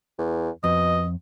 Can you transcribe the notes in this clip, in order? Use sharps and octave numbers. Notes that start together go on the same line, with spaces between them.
E2
F2 B2 D#5